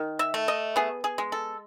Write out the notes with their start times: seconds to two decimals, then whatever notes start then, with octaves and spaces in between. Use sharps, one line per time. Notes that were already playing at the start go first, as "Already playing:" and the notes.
Already playing: D#3
0.19 E5
0.34 A3
0.48 D#5
0.76 B3 G#4
1.04 G#4
1.18 G#3
1.32 A4